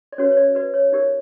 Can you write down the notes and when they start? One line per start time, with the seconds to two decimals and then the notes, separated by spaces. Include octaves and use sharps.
0.12 D5
0.18 C#4 F#4 B4 C#5
0.31 C#5
0.37 D5
0.55 F#4 B4 D5
0.74 C#5
0.92 D#4 G4 A#4 C#5 D5